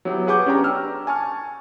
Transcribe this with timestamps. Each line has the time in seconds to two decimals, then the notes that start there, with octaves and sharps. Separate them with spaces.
0.05 F#3 B3 E4 G4
0.27 G#4 B4 F#5 C#6 D6 G6
0.46 C#4 D4 G4 G5 A#5
0.64 A#5 E6 F6
1.07 G#5 A5 C#6 F6